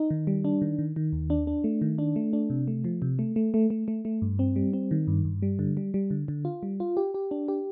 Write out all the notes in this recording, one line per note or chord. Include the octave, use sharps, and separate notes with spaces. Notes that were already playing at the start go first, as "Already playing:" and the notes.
Already playing: D#4
D#3
G3
D4
D#3
D#3
D#3
D#2
D4
D4
A3
D#3
D4
A3
D4
C3
A3
F3
C3
A3
A3
A3
A3
A3
A3
G2
C4
G3
C4
D#3
G2
G2
G3
D3
G3
G3
D3
D3
F4
G3
F4
G4
G4
D4
G4